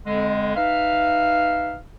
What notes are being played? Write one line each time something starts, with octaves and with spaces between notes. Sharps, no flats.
F2 D3 G#3
D#4 B4 E5 F5